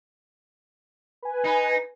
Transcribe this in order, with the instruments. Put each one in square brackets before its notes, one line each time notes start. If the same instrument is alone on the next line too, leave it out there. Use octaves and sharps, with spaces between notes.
[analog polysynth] B4 G#5
[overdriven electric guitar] D#4